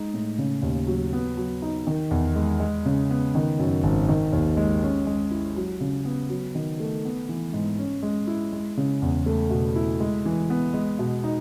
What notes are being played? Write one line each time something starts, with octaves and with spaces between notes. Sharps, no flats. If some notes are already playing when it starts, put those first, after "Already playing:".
Already playing: G#3 D#4
A2
C#3
D#2
F#3
B3
F#3
D#4
D#3
E2
G#3
G#3
C#3
B3
D#3
F#2
G#1
D#3
D#2
G#3
C#4
G#3
E4
F#3
C#3
B3
F#3
D#3
A3
B3
E3
G#2
C#4
G#3
E4
G#3
C#3
E2
A3
B2
E4
G#3
E3
B3
G#3
B2
D#4